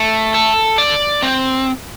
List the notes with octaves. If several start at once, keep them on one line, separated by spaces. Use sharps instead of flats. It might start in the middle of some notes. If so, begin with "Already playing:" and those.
Already playing: A3
A4
D5
C4